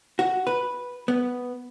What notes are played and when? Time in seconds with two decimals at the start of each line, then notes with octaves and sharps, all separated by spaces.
0.19 F#4
0.47 B4
1.08 B3